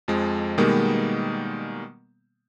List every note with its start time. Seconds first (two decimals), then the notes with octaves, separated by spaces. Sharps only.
0.08 F2 F3 G#3
0.58 B2 D#3 G3 G#3 A#3 B3